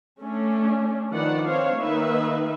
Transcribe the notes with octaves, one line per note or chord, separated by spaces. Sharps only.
A3 C#4 D4
D#3 F3 D4 B4 D5 F#5
C4 D4 C5 C#5 F5
D#3 A#3 D#4 B4 E5